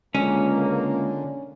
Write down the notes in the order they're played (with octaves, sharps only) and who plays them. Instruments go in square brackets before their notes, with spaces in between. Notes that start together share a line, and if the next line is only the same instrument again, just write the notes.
[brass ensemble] C#2 A#3 [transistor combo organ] D3 [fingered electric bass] G#3 [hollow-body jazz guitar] C#4